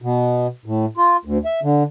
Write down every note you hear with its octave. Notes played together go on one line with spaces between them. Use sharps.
B2
A2
F4
D2
E5
D3